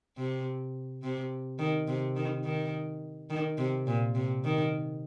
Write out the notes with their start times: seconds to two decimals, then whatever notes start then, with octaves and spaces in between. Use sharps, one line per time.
0.17 C3
1.03 C3
1.59 D#3
1.88 C3
2.16 D#3
2.44 D#3
3.30 D#3
3.58 C3
3.87 A#2
4.15 C3
4.44 D#3